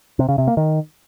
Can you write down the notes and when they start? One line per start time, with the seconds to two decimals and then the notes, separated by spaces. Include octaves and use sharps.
0.19 C3
0.29 C#3
0.38 C3
0.48 A#3
0.57 D#3